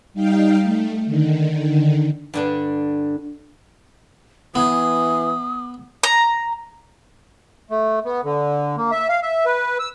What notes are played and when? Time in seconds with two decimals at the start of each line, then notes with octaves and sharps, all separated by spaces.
0.14 G3 D#4 F5 G5
0.63 A3
1.06 D3 D#3
2.34 G2 D3 D4
4.55 E3 B3 D#6
6.03 A#5
7.71 A3
8.05 B3
8.24 D3
8.77 A#3
8.92 E5
9.09 F5
9.23 E5
9.46 B4
9.79 E6